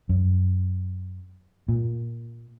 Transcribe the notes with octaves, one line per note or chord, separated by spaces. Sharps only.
F#2
A#2